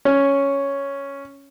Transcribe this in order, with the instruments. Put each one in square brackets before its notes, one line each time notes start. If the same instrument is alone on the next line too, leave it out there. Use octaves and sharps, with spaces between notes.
[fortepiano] C#4